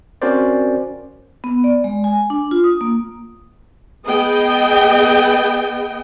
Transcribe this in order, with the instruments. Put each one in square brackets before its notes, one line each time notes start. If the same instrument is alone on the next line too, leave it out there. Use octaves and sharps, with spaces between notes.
[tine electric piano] C4 C#4 F#4 A#4 C5 D5
[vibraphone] B3
D5
G#3
G#5
D4
F4
D#6
A#3
[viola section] B3 G#4 D#5 G5